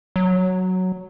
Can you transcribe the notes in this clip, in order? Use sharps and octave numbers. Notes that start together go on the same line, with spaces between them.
F#3